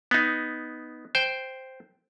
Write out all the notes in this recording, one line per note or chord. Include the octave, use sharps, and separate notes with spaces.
B3 D#4
C5 G5